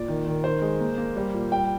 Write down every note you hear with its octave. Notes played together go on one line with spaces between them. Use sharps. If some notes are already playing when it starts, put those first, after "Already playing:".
Already playing: A#2 D5
D#3
D#3
D#3 C5
G#3
A#3
A#3
G3
A#2
G3 G5